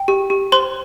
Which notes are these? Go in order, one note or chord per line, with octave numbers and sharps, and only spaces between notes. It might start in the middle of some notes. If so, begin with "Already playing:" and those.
Already playing: G5
G4
G4
C5 C6